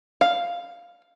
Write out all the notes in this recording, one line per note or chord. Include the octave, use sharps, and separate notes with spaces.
F5